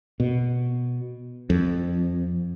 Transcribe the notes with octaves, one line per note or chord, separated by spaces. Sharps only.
B2
F2